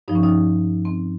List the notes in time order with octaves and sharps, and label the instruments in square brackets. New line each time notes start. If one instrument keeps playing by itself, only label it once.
[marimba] G2 F3 D#4
C#4
D#4
C4